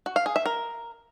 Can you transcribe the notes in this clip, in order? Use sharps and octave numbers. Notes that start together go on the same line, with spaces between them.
F#4
F5
G#4
E5
A#4